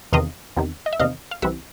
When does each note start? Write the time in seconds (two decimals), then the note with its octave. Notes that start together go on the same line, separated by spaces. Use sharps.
0.13 E2 C3 D#3 D#5 F5
0.57 E2 C3 D#3
0.86 D#5
0.93 E5
0.99 E2 C3 D#3 D#5 F5
1.31 F5
1.42 C2 C3 E3 E5 F#5